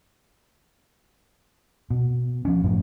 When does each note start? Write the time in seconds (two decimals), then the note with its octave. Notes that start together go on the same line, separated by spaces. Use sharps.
1.90 B2
2.45 F3 C#4
2.63 F1 F#2 A2 F3